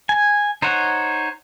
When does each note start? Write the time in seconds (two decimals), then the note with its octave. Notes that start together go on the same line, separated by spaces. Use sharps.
0.09 G#5
0.62 D#4 C5 C#5 F#5